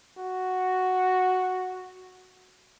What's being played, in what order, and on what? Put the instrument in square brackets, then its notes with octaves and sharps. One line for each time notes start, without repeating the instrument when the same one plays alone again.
[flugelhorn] F#4